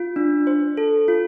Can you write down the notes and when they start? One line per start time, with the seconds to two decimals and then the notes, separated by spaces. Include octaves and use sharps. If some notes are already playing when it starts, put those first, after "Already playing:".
Already playing: F4
0.16 D4
0.47 C5
0.77 A4
1.08 F4